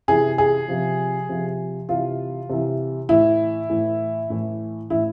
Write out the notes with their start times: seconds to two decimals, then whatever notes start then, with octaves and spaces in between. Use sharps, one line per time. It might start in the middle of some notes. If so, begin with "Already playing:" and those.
0.08 C3 E3 G#4
0.38 G#4
0.68 C3 F3
1.29 C3 F3
1.89 C3 E3 F4
2.49 C3 E3
3.09 A2 E3 E4
3.70 A2 E3
4.30 A2 E3
4.90 A2 E3 E4